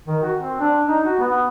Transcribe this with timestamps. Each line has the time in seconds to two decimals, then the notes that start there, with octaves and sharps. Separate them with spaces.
0.08 D#3
0.23 F#4
0.39 C4
0.60 D4
0.89 D#4
1.05 F#4
1.20 B3